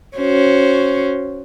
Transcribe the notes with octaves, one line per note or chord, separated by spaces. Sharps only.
C#4 F#4 C5